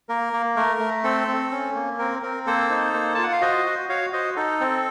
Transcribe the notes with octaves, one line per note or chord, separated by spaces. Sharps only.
A#3 A#4
A#3
A3 A#4
A3
C4 A4
C4
C#4
A#3
C4 A#4
C4 A#4
A#3 A4 C5
D#4
A#3
F4 A5
F#5
F5
F#4 C5 D#5
F#4
F#4 C#5 F5
F#4 C5 D#5
D#4 A4
C4